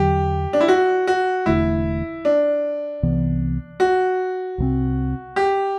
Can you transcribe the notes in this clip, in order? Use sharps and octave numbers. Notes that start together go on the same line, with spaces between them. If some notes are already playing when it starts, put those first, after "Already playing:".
Already playing: E2 D3 F#3 G4
D4
E4
F#4
F#4
E1 E2 D3 A3 E4
D4
C2 C3 E3 B3
F#4
C2 C3 F#3 C4
G4